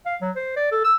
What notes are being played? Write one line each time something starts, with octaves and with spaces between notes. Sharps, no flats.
F5
F#3
C5
D5
A4
E6